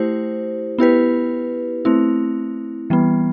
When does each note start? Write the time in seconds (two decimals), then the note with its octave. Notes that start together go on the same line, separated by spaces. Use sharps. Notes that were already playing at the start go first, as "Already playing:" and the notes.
Already playing: A3 E4 G4 C5
0.78 B3 E4 G4 B4
1.85 A3 C4 E4
2.90 E3 G3 B3